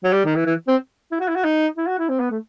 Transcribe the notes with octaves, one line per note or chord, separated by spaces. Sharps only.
F#3
G3
D#3
E3
E3
C4
E4
F#4
E4
F#4
D#4
E4
F#4
E4
C4
B3
A3